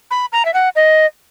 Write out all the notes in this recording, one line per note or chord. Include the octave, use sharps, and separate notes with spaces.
B5
A#5
E5
F#5
D#5